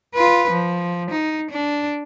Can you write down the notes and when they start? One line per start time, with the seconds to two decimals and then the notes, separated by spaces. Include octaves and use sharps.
0.14 F4 B4
0.51 F3
1.11 D#4
1.51 D4